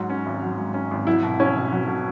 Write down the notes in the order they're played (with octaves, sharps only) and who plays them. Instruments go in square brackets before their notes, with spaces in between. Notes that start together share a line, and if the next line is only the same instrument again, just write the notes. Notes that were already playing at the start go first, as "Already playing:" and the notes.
Already playing: [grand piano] G#2 F#3
C#4
G#1
F#3
G#2
C#4
G#1
[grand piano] F#3 [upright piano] E4
[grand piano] B2
[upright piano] C#4 [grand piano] E4
[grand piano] B1
F#3
B2